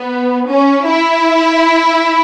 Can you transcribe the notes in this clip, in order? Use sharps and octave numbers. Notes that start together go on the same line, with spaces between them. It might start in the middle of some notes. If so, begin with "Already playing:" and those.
Already playing: B3
C#4
E4